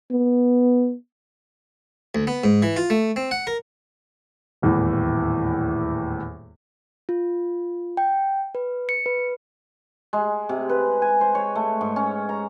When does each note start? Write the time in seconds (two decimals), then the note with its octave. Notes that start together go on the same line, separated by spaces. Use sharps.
0.11 B3
2.15 D2
2.27 B3
2.44 G#2
2.62 E3
2.76 F4
2.90 A3
3.16 C4
3.31 F#5
3.47 A#4
4.62 D#1 E2 A2 E3
7.09 F4
7.97 G5
8.55 B4
8.89 C#7
9.06 B4
10.13 G#3
10.49 C3
10.69 B4
11.02 G#5
11.21 C5
11.35 C#5
11.55 A3
11.81 G#2
11.96 C#4
12.29 A#5